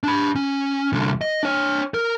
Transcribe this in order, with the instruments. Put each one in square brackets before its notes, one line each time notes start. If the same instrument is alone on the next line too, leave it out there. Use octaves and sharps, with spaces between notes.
[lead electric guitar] D4 B5
C#4
C2 D3
D#5
D4 C#5
A#4